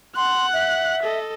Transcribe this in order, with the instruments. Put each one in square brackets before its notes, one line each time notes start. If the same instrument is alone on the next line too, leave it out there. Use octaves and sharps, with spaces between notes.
[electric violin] F#5 F#6 [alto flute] C6
[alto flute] E5
[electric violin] A4 D#5